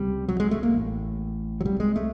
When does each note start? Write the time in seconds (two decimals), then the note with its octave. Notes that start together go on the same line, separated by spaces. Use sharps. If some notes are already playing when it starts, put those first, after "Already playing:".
Already playing: C#2 C3 G3
0.29 F#3
0.40 G#3
0.51 A3
0.63 A#3
0.74 A1 A2
1.61 F#3
1.65 C2 C3 G3
1.80 G#3
1.96 A3